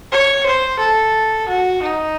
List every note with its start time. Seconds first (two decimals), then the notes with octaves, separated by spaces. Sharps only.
0.12 C#5
0.46 C5
0.79 A4
1.48 F#4
1.83 D#4